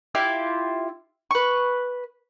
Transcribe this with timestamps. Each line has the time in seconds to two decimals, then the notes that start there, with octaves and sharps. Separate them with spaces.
0.15 E4 F4 G4 E5
1.31 B4 C#6